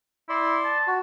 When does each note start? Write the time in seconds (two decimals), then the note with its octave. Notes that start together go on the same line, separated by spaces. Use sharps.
0.29 E4 D5 C6
0.65 A5
0.87 F#4